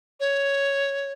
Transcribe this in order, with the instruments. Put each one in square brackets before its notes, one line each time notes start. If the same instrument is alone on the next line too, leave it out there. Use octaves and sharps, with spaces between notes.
[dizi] C#5